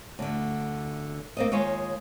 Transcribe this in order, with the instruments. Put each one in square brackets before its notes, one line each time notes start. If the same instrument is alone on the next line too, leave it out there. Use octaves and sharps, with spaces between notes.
[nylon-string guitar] D2 D3
A#3 C4 D#5
D#2 D#3 G#3 F4 C#5 D#5